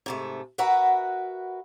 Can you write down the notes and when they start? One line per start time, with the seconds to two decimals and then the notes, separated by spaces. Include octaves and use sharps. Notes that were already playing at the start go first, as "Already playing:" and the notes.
0.06 G#2 C3 A3
0.58 F#4 A#4 B4 E5 F#5